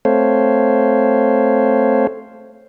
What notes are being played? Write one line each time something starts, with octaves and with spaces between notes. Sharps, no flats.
A3 C4 A4 C5 C#5 F5